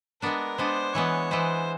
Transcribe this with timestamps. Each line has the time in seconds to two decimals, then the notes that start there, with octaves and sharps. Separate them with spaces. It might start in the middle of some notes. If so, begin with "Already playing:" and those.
0.22 G#3 B3 D4 A#4
0.58 G#3 B3 D4 C5
0.94 E3 G#3 B3 C#5
1.31 E3 G#3 B3 C5